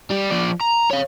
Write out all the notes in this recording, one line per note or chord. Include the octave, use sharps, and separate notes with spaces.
G3 G4
F3 D5
A#5
C#5 F5